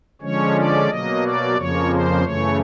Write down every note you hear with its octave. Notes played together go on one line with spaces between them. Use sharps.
D3 F3 G#3 C#4 C#5
D5
B2 F#3 A#3 D#5
D5
F2 C#3 F3 A#3 C#5
C5
F#2 C#3 E3 A3 C#5